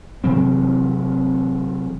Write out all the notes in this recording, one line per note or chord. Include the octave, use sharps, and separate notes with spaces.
C3 E3 F#3 C4